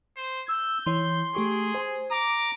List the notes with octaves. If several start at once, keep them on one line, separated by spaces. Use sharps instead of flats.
C5
E6 G6
E3 C#5 C6
A3 G4 G#4 C#6
C5 G#5
A#5 D6